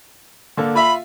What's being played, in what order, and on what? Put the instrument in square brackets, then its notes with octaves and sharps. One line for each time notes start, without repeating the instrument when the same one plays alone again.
[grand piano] D3 A#3 A4
[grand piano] F4 E5 F5 [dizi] B5